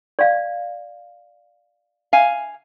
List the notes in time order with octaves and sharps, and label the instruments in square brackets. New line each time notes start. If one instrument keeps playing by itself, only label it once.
[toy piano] D5 F5
[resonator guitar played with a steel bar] F5 G#5